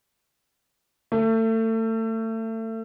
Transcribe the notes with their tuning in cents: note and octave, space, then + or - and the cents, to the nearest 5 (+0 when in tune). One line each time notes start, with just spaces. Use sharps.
A3 +30